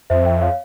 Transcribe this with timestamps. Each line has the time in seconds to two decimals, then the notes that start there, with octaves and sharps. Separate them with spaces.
0.10 F2 C5 E5
0.26 E5 G5
0.42 C#5 F5